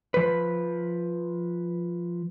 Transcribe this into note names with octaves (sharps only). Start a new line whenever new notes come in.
F3 B4